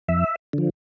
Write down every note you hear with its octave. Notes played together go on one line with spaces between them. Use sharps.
F2 E5
D3 F3